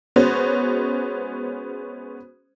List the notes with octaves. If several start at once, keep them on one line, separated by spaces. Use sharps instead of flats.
G#3 B3 C#4 F#4 C5